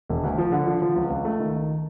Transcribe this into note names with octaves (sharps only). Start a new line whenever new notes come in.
E1
D2
F3
D3
F3
F3
C#2
C#2
A3
D#3
D#3